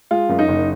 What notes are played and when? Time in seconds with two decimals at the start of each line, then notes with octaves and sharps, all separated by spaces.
0.11 G#3 F4
0.29 F#2
0.39 D#4
0.48 F#1